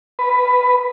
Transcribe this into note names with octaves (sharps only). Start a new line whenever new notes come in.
B4